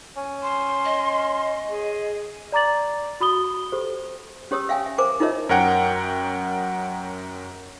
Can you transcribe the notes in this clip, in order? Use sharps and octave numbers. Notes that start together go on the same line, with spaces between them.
C#4
C6
D#5
G#4
D5 A#5 D6 A6 F#7
F#4 B5 D#6 G7
G4 A4 C5
C#4 G4 C#5 D#6 E6
E5 F5 G5 G#5
E5
A#4 C5 G#5 D6
D#4 F4 A#4 C#5 D#5 E5
F#2 A#4 C#5 F#5 G5 D7